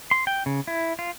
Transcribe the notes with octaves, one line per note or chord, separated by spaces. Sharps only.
C6
G5
C#3
E4
F4